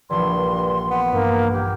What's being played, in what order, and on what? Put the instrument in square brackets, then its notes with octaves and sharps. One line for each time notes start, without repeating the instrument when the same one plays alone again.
[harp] A#1 E3 [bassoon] G2 [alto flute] C6
[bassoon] B3
[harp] G2 [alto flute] A#3
[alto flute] G4